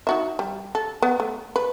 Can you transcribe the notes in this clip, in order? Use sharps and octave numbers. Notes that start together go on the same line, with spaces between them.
D#4 F#4 E5
G3
A4
B3
A3
B4